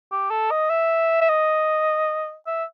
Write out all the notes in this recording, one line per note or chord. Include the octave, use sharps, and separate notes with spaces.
G4
A4
D#5
E5
E5
D#5
E5